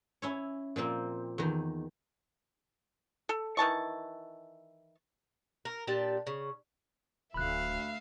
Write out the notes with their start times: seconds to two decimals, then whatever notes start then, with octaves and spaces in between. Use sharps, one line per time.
0.22 C#4 E4 C#5
0.76 A#2 F3 A#3 C4
1.38 E2 D#3
3.29 A4
3.57 D#3 E3 A5 C#6
5.65 A#4
5.87 A#2 D4 G4 A5
6.27 C#3
7.34 D1 D2 E5 F5 B5 F#6